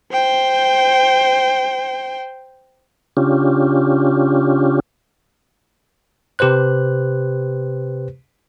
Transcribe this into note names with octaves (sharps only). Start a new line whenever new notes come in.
C5 G5
C#3 C#4 D4 F4 G4
C3 G4 B4 C5 F#6